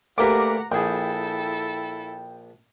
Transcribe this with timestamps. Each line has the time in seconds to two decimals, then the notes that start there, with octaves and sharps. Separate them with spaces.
0.18 D2 A#3 G4 A#4 B4 F#5 A#5 D6
0.72 A#1 E4 G#4 A4 G5